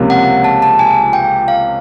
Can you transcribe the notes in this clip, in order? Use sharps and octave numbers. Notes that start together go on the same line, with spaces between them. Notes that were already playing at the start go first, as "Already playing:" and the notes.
Already playing: C#2 C3 F3 A#3 C#4
F#5
A5
A5
G#5
G5
F5